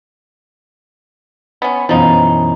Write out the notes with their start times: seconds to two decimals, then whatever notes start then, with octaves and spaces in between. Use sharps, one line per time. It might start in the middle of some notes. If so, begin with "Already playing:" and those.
1.62 B3 C#4
1.89 F#2 B2 E3 F3 D#4